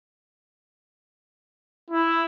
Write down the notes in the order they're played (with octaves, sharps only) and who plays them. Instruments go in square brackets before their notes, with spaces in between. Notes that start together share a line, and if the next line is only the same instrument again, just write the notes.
[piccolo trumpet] E4